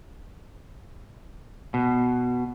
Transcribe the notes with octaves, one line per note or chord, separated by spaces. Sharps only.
B2